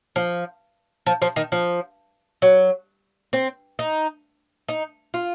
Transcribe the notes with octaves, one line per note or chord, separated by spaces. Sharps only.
F3
F3
F3
D#3
F3
F#3
C4
D#4
D#4
F4